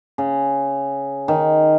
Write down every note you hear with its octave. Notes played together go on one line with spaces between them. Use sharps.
C#3
D#3